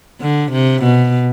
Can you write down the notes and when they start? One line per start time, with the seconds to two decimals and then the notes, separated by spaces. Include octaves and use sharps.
0.21 D3
0.52 C3
0.83 B2